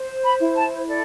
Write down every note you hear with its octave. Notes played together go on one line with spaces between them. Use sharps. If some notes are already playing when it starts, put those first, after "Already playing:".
Already playing: C5
B5
E4
A5
A4 D5